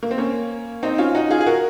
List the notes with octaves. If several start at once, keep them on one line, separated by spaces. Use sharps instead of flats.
A#3
C4
A#3 C#4
C4 D#4
C#4 F4
D#4 F#4
F4 G#4
G#4
F#4 A#4